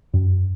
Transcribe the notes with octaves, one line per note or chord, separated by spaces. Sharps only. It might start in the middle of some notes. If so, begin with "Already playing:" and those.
F#2